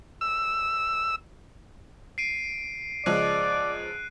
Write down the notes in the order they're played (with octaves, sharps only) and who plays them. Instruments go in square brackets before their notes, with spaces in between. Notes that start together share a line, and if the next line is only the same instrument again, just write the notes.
[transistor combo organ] E6
[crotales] C7 D7 D#7
[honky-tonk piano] C#2 F3 G#3 [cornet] D5 [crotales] F#6 D#7